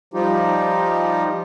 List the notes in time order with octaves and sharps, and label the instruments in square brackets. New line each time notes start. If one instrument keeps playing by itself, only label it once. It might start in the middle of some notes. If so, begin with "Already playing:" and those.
[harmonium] F3 G3 D#4 F4 G4